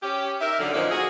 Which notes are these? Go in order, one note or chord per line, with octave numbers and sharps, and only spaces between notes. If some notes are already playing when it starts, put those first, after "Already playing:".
C#4 G4
D#4 A#4 E5
F#2 D3
A#2 F3 A#3 C#4 D#4
F#4 G#4